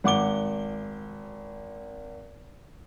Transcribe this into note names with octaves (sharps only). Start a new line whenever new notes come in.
G#1 F#5 D6 G7